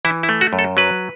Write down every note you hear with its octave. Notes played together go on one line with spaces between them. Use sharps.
E3 E4
E4
A3
F#4
F#2
A4
F#3 B4